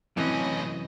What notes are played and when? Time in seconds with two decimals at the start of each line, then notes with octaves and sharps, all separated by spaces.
0.17 F#2 A2 C3 E3 C4 C#4 D#5